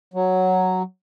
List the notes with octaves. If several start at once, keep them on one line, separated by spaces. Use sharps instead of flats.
F#3